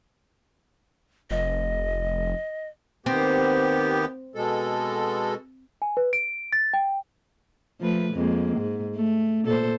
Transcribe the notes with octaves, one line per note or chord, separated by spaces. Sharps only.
F1 D#5
D#2 B3 C4 G4
B2 G#3 A4
G#5
B4
D7
A6
G5
F3 A3 B4
F2 G#3 A#3
G#2
A3
A#2 A4 C5